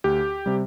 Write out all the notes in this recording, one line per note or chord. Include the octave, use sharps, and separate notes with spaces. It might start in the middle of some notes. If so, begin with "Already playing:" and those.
D2 G4
C3 G3